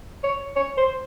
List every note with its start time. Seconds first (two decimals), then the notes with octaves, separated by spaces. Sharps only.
0.24 C#5
0.56 C#5
0.77 C5